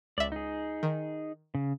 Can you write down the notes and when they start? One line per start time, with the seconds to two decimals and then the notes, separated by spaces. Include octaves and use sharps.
0.18 C#2 D5 E5
0.32 D#4 G#4
0.83 D#3
1.55 C#3